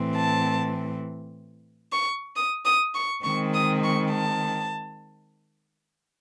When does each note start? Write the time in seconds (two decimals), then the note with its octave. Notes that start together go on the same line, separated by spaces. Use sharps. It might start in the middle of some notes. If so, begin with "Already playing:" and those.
Already playing: A2 E3 C4
0.16 A5
1.92 C#6
2.36 D#6
2.65 D#6
2.95 C#6
3.24 D#3 G#3 C4 C#6
3.54 D#6
3.83 C#6
4.12 A5